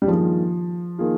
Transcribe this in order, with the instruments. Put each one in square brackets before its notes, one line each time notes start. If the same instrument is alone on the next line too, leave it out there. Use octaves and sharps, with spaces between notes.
[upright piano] G3
[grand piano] G2 D#3 A#3 F4 G#4 [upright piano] F3
[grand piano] D#3 A#3 F4 G#4